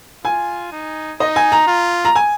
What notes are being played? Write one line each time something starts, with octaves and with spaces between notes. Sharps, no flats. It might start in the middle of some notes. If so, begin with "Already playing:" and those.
F4 G#5
D#4
D#4 D#5
G#5
A#5
F4
A#5
G#5